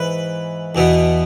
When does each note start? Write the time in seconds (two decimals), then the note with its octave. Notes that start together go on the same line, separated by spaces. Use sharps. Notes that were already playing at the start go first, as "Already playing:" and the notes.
Already playing: G#2 E3 B4
0.75 E2 B2 B3